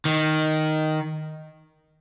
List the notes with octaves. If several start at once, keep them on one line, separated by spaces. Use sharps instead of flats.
D#3